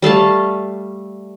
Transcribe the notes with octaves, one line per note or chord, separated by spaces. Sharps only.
G3 A3 F5 A5